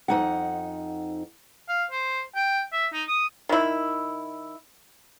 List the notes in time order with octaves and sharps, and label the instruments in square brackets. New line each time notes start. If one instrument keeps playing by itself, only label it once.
[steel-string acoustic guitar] F2 F3 D#4 F#5
[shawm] F5
C5
G5
E5
D#4
D#6
[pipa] D#3 E4